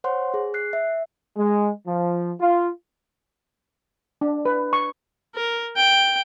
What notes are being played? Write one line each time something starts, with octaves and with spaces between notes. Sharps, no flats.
C5 C#5 F#5 C6
G#4
F#6 C7
E5
G#3
F3
F4
D4
B4
C#6
A#4
G5